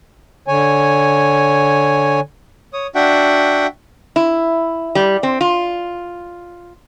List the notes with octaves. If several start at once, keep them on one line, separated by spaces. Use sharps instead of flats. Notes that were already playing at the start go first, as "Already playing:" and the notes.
D3 C#5 G#5
C#5 D#6
D4 F#4 E5 F#5 G5
E4
G3
C4
F4